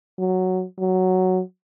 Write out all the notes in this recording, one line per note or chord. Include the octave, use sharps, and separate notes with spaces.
F#3
F#3